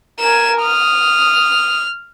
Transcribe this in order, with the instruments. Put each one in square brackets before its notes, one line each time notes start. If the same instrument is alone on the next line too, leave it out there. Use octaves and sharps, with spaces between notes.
[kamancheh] A#4 G#5 [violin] E7
[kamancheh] D#6 [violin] F6